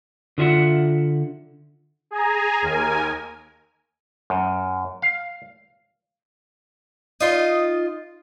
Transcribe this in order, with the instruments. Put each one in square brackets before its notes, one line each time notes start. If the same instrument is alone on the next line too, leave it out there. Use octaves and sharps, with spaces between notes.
[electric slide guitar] D3 F4 E5 F#5
[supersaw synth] G#4 G#5 A#5
D#2 A#4 G#5
[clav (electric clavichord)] F#2
F5
[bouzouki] D#4 F4 C#5 D#5